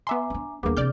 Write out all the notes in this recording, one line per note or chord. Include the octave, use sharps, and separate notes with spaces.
B3 E5 G#5 A#5 C6 D6
C#4 D4
D#2 G3 A#3 B3 D4 G#4 D6
C3 E3 D5 F6 G6